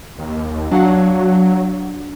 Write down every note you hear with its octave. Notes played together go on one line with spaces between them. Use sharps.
D#2
F#3 D4 F5 F#5